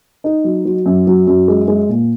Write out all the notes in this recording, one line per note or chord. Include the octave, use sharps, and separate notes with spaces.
D#4
F#3
F#3
F#2
F#3
F#2
G#3
G#3
A#2